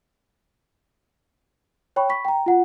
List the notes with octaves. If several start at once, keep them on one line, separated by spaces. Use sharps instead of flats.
C#5 G5 B5 C#6
B5 C#6 B6
G5 A#5
F4 F#5